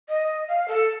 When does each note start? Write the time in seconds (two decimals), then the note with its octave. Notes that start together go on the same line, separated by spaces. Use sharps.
0.09 D#5
0.48 F5
0.68 A4